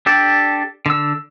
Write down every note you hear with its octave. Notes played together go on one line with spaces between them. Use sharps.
D4 G4 A4 D5
D3 E6